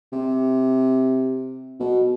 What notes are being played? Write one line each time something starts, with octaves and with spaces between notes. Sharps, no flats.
C3
B2